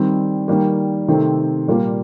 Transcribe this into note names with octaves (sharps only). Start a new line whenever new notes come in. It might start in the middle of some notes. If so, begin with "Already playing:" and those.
Already playing: D#3 G3 C4
D#3 G3 A#3
C3 D#3 A3 C4
A#2 G3 A#3 F4